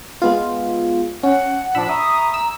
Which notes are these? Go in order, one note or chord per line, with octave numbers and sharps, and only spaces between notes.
G#3 B3 F4
C#4 F#5
A#2 F3 D4 B5 E6
E5 A#5 C#6 D#6
E6